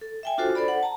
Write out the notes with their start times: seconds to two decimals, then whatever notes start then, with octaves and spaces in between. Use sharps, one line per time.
0.01 A4
0.23 E5 G5 G#5
0.38 D4 F4 F#4 A4 C5
0.55 D4 A4 C5 D5 B5
0.68 F#5
0.83 A5 A#5